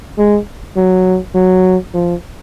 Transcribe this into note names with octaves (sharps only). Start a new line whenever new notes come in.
G#3
F#3
F#3
F3